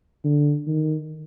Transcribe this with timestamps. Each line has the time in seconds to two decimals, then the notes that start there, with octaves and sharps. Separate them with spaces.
0.24 D3
0.67 D#3